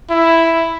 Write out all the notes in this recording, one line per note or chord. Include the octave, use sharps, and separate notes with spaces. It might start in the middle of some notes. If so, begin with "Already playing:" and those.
E4